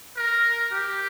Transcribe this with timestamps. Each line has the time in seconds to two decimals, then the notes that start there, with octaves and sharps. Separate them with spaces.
0.17 A#4
0.73 G4